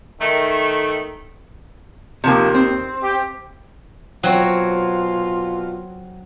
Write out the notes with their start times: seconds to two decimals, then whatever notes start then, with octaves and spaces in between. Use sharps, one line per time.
0.20 D#3 A3
2.24 D#2 C3 F3 A#3
2.55 C4
3.03 G4
4.23 B2 F#3 C4 F4 C#5